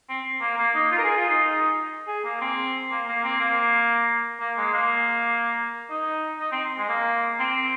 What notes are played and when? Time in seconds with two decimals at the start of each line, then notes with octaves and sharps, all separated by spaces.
0.09 C4
0.41 A#3
0.58 A#3
0.75 D#4
0.92 F4
0.98 A#4
1.04 G#4
1.17 F4
1.29 D#4
2.08 G#4
2.25 A#3
2.41 C4
2.91 A#3
3.08 A#3
3.24 C4
3.41 A#3
4.40 A#3
4.57 G#3
4.74 A#3
5.90 D#4
6.39 D#4
6.52 C4
6.77 G#3
6.89 A#3
7.39 C4